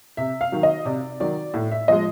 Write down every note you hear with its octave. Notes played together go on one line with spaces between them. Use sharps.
C3 E5
F5
D#3 F#3
D#5
C3 D5
D#3 F#3 D5
A2
E5
F3 G#3 D#5